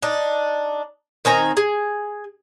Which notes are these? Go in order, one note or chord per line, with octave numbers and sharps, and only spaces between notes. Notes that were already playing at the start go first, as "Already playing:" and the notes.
D4 D#4
D#3 C4 G#5 A#5
G#4